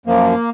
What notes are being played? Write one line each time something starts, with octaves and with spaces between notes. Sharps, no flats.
F#2 F3 A#3